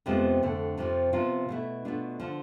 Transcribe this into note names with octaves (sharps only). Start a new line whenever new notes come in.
F2 C3 F3 G#3 B3
F2 D3 A3
F2 C3 F3
C3 F3 B3 F4
B2 A3 E4
B2 A3 D4 F4
D3 F3